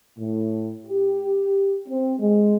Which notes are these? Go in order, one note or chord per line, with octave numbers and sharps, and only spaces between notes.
A2
G4
C4
G#3